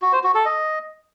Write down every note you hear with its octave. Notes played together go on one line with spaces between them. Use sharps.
F#4
C5
F#4
A4
D#5